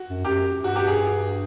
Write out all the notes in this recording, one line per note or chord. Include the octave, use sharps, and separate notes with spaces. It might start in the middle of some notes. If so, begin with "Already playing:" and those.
Already playing: F#4
F#2
F#2 G4
G2
F#4
G4
G#4